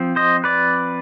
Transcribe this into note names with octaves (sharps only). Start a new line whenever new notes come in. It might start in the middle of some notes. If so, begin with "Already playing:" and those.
Already playing: F3 C4
C5 D#5
B4 D5